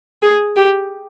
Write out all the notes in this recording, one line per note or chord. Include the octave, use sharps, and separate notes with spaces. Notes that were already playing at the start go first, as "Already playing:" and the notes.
G#4
G4